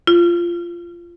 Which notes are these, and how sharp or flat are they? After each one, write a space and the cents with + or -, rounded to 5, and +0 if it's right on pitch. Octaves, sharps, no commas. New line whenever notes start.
F4 -15